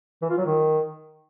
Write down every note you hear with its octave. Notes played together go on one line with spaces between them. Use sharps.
E3
F4
F#3
D#3